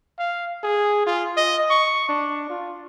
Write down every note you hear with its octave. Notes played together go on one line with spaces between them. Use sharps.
F5
G#4
F4
D#5
C#6
D4
F4